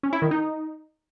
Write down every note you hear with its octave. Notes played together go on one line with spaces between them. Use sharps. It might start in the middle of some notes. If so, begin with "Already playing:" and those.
C#4
E4
D#3
D#4